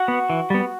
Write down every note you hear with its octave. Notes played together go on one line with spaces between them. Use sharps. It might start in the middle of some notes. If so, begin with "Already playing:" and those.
Already playing: F#4 F#5
B3
E3
G3 B3